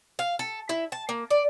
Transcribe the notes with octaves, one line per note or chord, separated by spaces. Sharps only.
F5
A4
E4
A5
A#3
D5